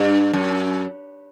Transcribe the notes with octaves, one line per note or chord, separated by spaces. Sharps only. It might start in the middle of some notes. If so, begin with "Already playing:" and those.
Already playing: G2
F#2